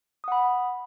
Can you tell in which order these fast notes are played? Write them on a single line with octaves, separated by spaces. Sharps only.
D#6 F#5 B5